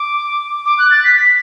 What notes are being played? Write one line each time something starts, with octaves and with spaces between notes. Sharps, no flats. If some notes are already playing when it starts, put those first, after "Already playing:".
Already playing: D6
D6
F#6
A6
B6
B6